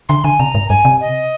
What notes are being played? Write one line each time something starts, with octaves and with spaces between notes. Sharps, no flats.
D3 C6
D3 G#5
C3 A#5
G#2
G2 G#5
C3
D#5